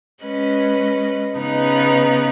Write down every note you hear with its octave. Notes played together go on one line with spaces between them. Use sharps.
G#3 C#4 B4 D#5
C#3 B3 D#4 B4